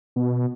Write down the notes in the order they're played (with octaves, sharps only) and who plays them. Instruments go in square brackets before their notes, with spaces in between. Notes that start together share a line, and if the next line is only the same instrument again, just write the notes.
[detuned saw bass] B2